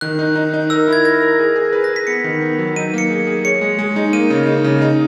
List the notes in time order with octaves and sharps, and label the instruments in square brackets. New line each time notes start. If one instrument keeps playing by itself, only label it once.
[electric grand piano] D#3 [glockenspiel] F#6
[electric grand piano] D#4
D#4
D#4
[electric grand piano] A#4 [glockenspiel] E6
[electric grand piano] E4 [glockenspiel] G#6
[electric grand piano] A#4 [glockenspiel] A#6
[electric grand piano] A#4
G#4
G#4
B4
[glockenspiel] A#6
[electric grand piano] G#4
[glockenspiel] B6
[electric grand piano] B3 [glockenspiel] C#7
[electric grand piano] D#3
B3
F#3
[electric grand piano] D#4 [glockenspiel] D#7
[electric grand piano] A#3 [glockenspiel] C#7
[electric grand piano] G#4
G#4
[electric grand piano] C#5 [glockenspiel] C#7
[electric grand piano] G#3
G#3
D#4
[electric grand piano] A#3 [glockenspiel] D#7
[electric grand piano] C#3
D#4
C#3
D#4